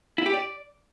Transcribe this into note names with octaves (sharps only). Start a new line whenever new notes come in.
E4
G4
D5